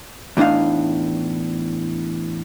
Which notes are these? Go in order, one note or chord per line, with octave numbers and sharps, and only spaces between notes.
E2 A2 D4 D#4 F5